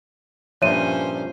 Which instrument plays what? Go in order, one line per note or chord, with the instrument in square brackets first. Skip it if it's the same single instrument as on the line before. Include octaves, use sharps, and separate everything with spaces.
[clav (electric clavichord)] G2 A#2 F3 [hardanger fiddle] C#4 C5 [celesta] C#5 E5 D#7